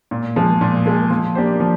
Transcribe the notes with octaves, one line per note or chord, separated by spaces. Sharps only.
A#2
F3 G#3
A#2
F3 G#3
F3
A#3 D4 G4 C5
F3